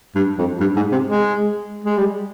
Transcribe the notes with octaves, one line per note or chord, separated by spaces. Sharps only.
G2
F2
G2
G#2
C3
G#3
G#3
G3